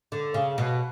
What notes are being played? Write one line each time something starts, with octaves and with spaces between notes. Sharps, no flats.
D3
C#3
B2